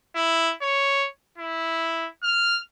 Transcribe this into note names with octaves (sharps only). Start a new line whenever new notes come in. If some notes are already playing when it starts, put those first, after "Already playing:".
E4
C#5
E4
F6